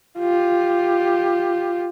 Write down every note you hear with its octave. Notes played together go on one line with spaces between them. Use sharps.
F4 G4